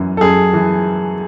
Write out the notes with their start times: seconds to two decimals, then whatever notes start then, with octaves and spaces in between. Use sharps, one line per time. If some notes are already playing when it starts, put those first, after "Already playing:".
Already playing: F#2 E3
0.17 A4
0.21 F#2 G#4
0.54 E3